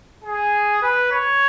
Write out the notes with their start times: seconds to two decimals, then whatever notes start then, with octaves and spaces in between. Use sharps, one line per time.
0.24 G#4
0.82 B4
1.12 C#5